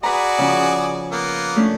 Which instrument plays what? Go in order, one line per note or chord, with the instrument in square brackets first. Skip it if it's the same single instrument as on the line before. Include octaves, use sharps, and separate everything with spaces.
[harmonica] F#4 G#4 D5 [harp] B4 A#5
[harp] C#3 F3 C#4
[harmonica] A#3 B3
[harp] A3 C#4 D4